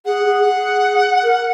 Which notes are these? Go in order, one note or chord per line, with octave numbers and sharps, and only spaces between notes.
G#4 F#5
G#4
G#4
A#4